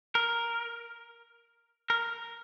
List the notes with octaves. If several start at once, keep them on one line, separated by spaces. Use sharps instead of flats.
A#4
A#4